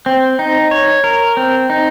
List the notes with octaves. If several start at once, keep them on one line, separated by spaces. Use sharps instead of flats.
C4
D#4
C#5
A#4
C4
D#4